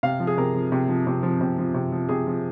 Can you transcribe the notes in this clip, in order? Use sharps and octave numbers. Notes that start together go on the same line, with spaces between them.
C3 F5
F3
G#4
C3 A#4
F3
C3
F3
C3
F3
C3
F3
C3
F3
C3 G#4
F3